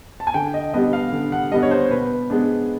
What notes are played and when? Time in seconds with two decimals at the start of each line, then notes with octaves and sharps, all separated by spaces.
0.20 A5
0.27 G#5
0.34 D3 G5
0.54 D#5
0.74 G3 B3 D4 D#5
0.93 F5
1.12 D3
1.32 F#5
1.52 G3 B3 D4 D#5
1.63 C#5
1.71 C5
1.91 B2 B4
2.30 G#3 B3 D4